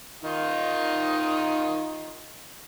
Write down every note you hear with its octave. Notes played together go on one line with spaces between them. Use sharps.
D#3 D#4 F4